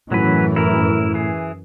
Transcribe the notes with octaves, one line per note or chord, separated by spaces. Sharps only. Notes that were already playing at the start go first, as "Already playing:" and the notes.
F#2 A2 E3 F#3 C#4 B4
E4 A#4
E3 G#4